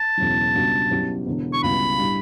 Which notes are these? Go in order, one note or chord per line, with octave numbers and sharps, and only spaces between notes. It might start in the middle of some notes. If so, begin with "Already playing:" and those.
Already playing: A5
E1 E2 C#3 F#3
C#2 B2 G3 D4 F#4
B2 F#3 C#4 E4 G4
E1 E2 D3
C#6
C#2 B2 G3 B3 E4 B5
A2 G3 D4